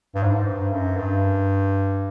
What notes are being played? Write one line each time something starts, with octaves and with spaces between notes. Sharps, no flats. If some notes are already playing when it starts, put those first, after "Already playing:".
G2
G#2
G2
F#2
G2